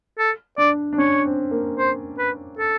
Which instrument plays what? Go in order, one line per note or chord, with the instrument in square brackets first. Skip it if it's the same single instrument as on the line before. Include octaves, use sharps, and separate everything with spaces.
[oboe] A4
[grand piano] D4 [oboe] D5
[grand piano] D4
[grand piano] C#4 [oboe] C#5
[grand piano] C4
A#3
[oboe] C5
B4
A4